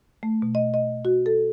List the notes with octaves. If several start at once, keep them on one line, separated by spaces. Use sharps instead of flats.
A3
B2
D#5
D#5
F#4
A4